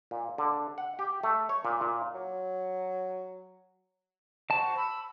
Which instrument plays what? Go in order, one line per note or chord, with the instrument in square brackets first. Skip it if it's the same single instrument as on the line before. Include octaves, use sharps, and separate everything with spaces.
[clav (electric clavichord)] A#2
D3
F#5
G4
A3
C#5
A#2
A#2
[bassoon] F#3
[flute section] F#4 C5 [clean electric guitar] A5
[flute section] B5 E6